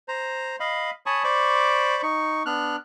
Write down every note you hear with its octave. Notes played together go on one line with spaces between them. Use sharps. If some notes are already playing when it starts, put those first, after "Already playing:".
C5 A#5
D#5 F5 B5
C#5 G#5 A5 B5 C#6 D#6
C5 D5 B5 C#6 D6
D#4 C#6
B3 D4 F6 F#6